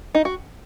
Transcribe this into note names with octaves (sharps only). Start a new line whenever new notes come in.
D#4
F#4